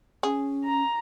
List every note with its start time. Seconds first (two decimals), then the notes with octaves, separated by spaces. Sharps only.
0.23 C#4 G#4
0.64 A#5